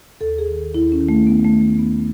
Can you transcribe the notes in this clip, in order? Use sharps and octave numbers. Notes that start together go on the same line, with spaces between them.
D#2 A4
G#4
D#3
D#2 E4
C#4
D#3
A3
D#2 B3
A3
D#3
A3
D#2 B3